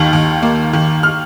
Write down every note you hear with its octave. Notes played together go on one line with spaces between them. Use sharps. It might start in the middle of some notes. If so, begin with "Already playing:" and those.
Already playing: D#2 D#3
D#2
A#3
D#3
F6